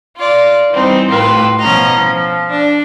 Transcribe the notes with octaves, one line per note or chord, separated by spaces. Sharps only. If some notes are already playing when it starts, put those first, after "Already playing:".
F4 D5
E3 G3 C4 D#4
A2 F4 G4 B4 E6
B2 F3 C#4 D#5 A#5
F3
D4